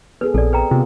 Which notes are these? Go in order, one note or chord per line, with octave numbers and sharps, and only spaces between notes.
B3 G#4 A4 B4
A#1 C4 A4 D5
B4 G5 A#5
C3 B3 F4